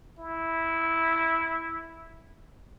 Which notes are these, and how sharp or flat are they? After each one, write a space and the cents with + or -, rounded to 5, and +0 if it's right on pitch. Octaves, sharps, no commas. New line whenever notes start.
E4 -5